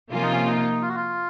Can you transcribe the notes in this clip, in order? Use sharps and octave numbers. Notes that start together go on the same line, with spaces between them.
C3 F3 A#3 C#4 F4
D#4
C#4
D#4
F4
F#4
F4